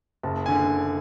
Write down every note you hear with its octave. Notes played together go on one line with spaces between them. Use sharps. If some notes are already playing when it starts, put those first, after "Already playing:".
F#1 A5
D3 G#5